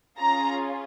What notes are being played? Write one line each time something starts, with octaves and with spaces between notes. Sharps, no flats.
C#4 F4 G#4 A#5